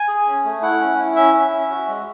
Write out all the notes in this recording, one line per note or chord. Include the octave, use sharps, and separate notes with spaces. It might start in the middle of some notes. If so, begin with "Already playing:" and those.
Already playing: G#5
G#4
C#4
A3
E4 F#5
C#4
E4
C#4 E5
C#4
C#4
F#4
G#3